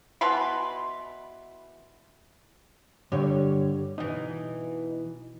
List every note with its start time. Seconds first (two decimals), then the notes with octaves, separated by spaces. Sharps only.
0.21 B2 E3 B4 C6
3.12 G2 D3 G3 C#5
3.98 B2 E3 D#4